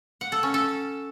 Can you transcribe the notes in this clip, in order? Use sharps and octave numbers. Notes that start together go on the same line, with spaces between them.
F#5
A4
C#4
A4